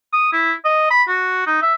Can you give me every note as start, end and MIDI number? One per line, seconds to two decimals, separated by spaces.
0.12 0.30 87
0.32 0.52 64
0.64 0.88 75
0.90 1.02 83
1.08 1.42 66
1.46 1.61 63
1.62 1.74 76